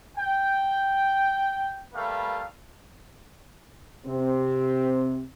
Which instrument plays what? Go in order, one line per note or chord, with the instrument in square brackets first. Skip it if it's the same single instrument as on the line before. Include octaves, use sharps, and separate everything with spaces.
[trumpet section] G5
G3 A3 A#3 B4 F5
[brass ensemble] C3 C4